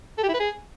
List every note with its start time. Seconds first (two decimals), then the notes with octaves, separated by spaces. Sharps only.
0.18 A4
0.23 G4
0.29 E4
0.34 B4
0.40 G#4